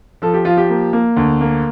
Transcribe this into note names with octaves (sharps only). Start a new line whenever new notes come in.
F3 A4
G4
F3 F4
G4
A#3
A#3
D2
A#3